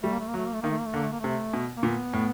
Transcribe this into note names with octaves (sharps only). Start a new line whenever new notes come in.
G3 A3
A#3
A3
A#3
F#3 A3
A#3
A3
D#3 A#3
A3
A#3
A3
D3 A#3
A3
A#3
C3 A3
B2
A#3
A#2 B3
A2